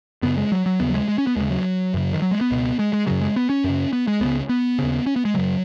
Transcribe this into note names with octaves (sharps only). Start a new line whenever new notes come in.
F#2 C#3 B3
G#3
F#3
F#3
D#2 C#3 B3
F#3
G#3
G#3
C#4
B3
D#2 C#3 G#3
F#3
F#2 C#3
D#3
F#3
G#3
B3
C#2 B2
G#3
G#3
F#2 C#3 F#3
G#3
B3
C#4
F#2 C#3
B3
G#3
C#2 C#3 B3
B3
D#2 C#3
C#4
B3
G#3
F#2 C#3 F#3